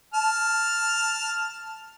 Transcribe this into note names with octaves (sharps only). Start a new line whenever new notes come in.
A5 F6